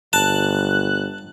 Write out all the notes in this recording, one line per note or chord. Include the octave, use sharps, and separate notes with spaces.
G1 A5 F#6